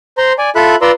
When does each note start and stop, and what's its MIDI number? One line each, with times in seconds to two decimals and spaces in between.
0.18 0.33 72
0.18 0.33 82
0.18 0.33 84
0.38 0.50 74
0.38 0.50 80
0.56 0.76 65
0.56 0.76 69
0.56 0.76 76
0.56 0.76 83
0.56 0.76 90
0.82 0.91 65
0.82 0.91 71
0.82 0.91 74
0.82 0.91 82
0.82 0.91 84
0.82 0.91 88